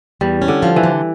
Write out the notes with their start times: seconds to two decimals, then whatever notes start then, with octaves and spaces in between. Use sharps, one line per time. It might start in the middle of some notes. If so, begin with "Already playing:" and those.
0.21 E2 G3
0.42 C#4
0.48 D3
0.63 F3
0.76 E3
0.83 D3